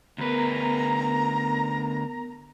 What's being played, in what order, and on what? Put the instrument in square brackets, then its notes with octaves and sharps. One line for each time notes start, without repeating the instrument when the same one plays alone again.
[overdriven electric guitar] D2 B4 [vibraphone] B3 A#4 [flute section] A#5